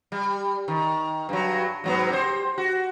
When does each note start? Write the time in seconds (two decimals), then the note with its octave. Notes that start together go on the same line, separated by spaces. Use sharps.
0.12 G3
0.68 D#3
1.29 G2 F#3
1.84 G#2 F#3 B3
2.10 G4 C5
2.58 F#4